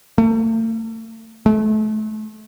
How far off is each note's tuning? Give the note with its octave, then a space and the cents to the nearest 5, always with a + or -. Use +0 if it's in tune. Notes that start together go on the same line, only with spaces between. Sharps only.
A3 +40
A3 -35